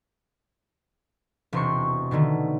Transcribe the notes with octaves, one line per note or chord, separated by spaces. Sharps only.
E1 C3 C4 C6 C#6
B2 D3 D#3 A3